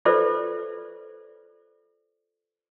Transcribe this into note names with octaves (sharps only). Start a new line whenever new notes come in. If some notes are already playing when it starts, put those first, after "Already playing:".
F4 A4 B4 C5 D5 E5